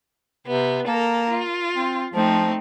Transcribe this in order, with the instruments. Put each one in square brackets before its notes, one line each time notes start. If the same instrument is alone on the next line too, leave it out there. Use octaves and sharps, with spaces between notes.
[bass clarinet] C3 [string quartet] B3
[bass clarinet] A#3 [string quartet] A4 A#4
[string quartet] F4
[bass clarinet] C4
[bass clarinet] F3 [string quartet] A3 C4 D#4